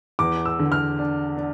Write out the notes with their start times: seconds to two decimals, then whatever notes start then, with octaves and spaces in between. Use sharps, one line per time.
0.19 E2 D6
0.45 E6
0.59 D3
0.72 F6
0.99 D4
1.37 D4